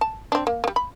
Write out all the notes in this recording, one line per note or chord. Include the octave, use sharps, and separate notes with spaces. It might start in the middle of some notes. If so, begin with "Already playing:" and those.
A5
C4 D4
A#3
G3 A#3
B5